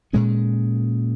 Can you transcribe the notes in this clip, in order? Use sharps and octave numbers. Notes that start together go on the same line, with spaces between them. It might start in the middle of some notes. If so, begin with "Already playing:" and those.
A#2 G#3 C#4